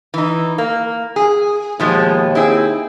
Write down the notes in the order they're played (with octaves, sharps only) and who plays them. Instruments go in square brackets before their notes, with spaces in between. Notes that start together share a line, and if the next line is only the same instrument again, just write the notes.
[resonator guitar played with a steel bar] E3 D#4
A#3
G#4
[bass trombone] D#2 [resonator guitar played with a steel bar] B2 F3 G#3
[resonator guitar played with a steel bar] C4 E4 G#4